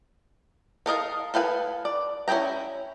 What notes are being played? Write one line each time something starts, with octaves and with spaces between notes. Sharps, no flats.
A4 A#4 D#5 F5
A4 B4 F5 G5 G#5
D5
C#4 E4 B4 G5 A#5